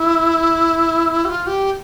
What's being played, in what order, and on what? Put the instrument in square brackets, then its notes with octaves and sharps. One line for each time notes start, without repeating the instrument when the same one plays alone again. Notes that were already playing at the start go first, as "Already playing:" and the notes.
Already playing: [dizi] E4
G4
F4
G4